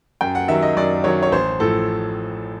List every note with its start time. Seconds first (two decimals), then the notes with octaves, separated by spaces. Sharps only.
0.21 F#2 G5
0.35 F#5
0.48 D#3 F#3 E5
0.62 D#5
0.77 F#2 D5
1.04 D#3 F#3 C#5
1.23 C#5
1.31 A1 C5
1.60 A2 F3 A4